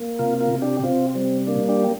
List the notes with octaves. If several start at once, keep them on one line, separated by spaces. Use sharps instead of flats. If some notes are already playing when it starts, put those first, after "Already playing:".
Already playing: A#3
C3 F4 A#4
F4 A#4
C3
D4 G4
C3 C4 F4
G3 C4
A#3 D4
D4 G4